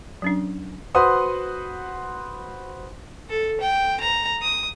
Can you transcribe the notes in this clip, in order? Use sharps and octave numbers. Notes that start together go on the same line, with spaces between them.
F#3 C#4 D4
F#4 B4 C5 F#5 C6 D#6
A4
G5
A#5
D#6